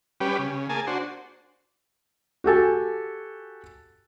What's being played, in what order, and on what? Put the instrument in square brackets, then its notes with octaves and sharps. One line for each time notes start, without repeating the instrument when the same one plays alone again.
[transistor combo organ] G3 C#4 G4 B4
C#3
A#3 G#4 G#5 A5
D4 F#4 C5
[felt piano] F#4 G4 A4 G#5